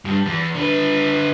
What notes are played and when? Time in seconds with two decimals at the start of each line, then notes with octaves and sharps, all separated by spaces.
0.05 G2
0.26 E2
0.55 D3 B4